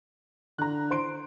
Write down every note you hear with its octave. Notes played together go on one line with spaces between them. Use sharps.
D3 A#5 F#6
C5 C6 D7